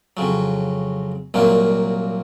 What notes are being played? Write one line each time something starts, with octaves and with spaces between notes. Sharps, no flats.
F2 C#3 F#3
C2 A#2 F#3 A#3